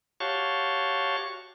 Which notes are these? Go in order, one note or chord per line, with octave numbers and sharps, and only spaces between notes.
F#4 G4 C#5 F5 A5 C#6